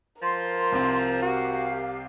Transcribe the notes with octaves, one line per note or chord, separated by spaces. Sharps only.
F3 A#4 C6
C2 C3 C4
F#4 G4 F5